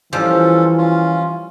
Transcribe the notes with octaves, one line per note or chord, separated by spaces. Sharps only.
E3 F3 G3 C#4 F4 A4
C#4 F4